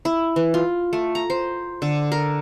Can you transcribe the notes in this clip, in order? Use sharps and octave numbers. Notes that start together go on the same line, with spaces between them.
E4
E3
F4
A3
A#5
C5
D3
A#4